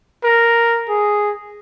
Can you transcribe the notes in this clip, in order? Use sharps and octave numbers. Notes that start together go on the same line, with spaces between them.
A#4
G#4